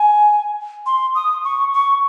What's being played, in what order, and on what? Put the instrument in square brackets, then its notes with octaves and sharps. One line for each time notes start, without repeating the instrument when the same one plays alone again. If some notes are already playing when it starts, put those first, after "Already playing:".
Already playing: [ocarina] G#5
C6
D#6
C#6
C#6